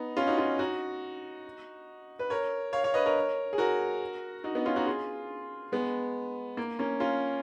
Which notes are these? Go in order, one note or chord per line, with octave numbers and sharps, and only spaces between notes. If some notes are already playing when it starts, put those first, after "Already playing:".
Already playing: B3 D#4
C#4 F4
D#4 F#4
C#4 F4
D#4 F#4
B4
A#4 C#5
C#5 F5
C#5 F5
B4 D#5
A#4 C#5
G#4
F#4 A#4
D#4 F#4
B3 D#4
C#4 F4
D#4 F#4
F4 G#4
G#3 B3
A#3
A#3 C#4
C#4 F4